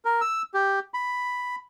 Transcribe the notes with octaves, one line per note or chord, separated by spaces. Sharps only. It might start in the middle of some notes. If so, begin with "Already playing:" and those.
A#4
E6
G4
B5